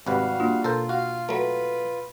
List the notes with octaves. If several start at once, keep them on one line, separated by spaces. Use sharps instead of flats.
G#1 C3 G3 F#4 B4 F5
A#3 D4 F4
B2 F4 A4 A#4 C5
F#4 F5
F#3 A3 B4